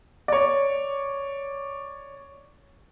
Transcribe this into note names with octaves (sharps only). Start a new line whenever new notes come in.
C#5 D5